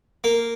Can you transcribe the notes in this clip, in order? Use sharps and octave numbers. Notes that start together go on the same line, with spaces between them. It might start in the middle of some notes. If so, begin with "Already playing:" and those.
A#3